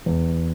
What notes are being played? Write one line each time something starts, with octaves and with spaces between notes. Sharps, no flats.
E2